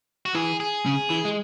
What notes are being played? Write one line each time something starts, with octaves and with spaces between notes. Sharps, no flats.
F#4
E3 G#4
G#4
C#3
E3
G#3